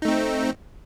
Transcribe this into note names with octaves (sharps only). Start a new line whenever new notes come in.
A3 C4 D#4